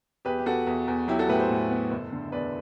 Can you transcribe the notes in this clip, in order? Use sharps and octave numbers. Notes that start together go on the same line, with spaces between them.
E2 G4 B4
G4
E2 F#4 A4
E2
E2
F#3 E4 G4
F#4 A4
A2 G4 B4
A4 C5
A2
B3
F#1
D3
E2 B4 D5